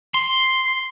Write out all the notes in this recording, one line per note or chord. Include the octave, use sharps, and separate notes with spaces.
C6